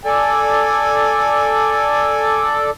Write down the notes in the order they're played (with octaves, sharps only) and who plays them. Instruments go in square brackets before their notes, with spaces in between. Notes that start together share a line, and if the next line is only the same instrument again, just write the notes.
[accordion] A4 D5 [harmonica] G#5